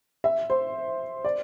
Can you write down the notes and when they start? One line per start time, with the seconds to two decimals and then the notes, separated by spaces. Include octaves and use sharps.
0.24 E5
0.50 C5
1.25 D5